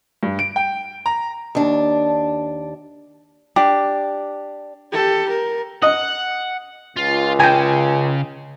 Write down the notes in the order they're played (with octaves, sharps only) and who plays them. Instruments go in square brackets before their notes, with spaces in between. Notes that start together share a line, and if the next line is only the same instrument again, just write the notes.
[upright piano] G2
D7
G5
A#5
[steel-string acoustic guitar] D#2 D4
[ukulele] D4 G4
[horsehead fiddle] G4 A4
A#4
[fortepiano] D#5 [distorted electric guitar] F#5
[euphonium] C#2 [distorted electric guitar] F4
[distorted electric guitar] C#3 [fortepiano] G5 G#5